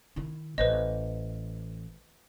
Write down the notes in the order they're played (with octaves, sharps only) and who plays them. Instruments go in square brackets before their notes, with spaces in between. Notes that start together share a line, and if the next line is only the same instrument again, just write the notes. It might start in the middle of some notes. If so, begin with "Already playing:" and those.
[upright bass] D#3 E4
[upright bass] A1 [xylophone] B4 C5 D#5